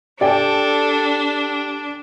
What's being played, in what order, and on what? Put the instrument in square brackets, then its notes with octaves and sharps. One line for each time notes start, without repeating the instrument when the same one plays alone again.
[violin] D4 [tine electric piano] G4 [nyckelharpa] A4 [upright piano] D5 G5 G#5